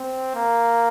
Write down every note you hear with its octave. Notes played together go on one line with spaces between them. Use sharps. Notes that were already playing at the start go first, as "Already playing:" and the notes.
Already playing: C4
A#3